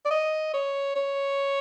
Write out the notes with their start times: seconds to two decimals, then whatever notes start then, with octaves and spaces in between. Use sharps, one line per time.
0.05 D5
0.11 D#5
0.54 C#5
0.96 C#5